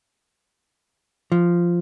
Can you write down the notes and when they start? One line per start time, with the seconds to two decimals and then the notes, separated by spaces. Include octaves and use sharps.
1.32 F3